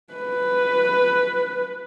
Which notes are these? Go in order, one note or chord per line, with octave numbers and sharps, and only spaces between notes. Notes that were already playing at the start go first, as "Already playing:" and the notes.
B4